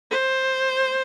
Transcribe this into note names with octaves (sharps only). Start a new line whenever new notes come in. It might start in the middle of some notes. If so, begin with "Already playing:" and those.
C5